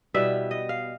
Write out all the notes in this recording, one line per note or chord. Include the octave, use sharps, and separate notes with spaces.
B2 G3 B3 E4 E5
D#5
F5